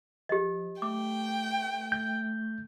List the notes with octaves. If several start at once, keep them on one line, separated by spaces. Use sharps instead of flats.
F3 G4 D#5
A3 G5 D6
G6